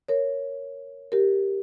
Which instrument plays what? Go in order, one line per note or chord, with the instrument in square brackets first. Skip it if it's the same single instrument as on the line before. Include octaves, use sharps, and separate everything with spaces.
[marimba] A#4 C#5
G4 A#4